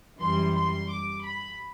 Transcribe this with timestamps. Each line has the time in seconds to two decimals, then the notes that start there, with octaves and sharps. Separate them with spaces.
0.19 F#2 E3 G3 C6
0.53 C6
0.88 D6
1.22 B5